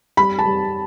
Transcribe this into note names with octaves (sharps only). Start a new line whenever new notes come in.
G3 B5
A5
G3